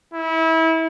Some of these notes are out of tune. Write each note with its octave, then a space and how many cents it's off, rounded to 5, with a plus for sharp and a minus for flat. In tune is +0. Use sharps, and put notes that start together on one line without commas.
E4 -25